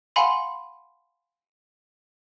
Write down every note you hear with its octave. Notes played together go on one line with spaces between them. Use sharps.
F5 F#5 G#5 B5 C6